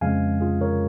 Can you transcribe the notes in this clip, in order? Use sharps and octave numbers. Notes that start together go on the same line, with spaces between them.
F2 C#3 F3 G#3 F5 G#5
F4 G#4
A#4 C#5